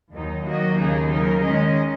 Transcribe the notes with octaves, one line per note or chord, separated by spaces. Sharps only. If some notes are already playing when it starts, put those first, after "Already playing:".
D#2 D#3 F#3 D#4
D#3 F#3 A#3 F#4 D#5
D#2 C#3 A#3 D#4 G#4
C#3 F#3 D#4 A#4
D#3 G#3 C#4 G#4 D#5